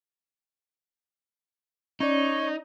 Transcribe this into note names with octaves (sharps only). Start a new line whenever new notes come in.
C#4 D#4 C#5 D5